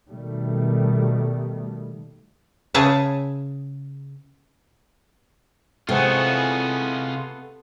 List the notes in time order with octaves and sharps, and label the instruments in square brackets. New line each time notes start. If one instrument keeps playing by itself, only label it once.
[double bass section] B2 D#3 G3 A3
[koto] C#3 G#4 E5 A5
[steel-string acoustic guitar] C3 [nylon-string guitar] E3 G#3 C4 [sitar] A3 B3 [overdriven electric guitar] F4 G#4